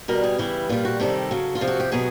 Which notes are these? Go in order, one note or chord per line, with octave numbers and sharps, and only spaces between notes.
B2 G3 A#4
G#4
C#3 E3 G3 E4
A#2 G3 F4
F#4
C3 D#3 G3 A4
C#3 F#3
F4
C3 F3
F#4
G4
B2 F#3 G#4